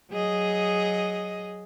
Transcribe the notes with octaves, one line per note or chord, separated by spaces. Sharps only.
F#3 G#4 D#5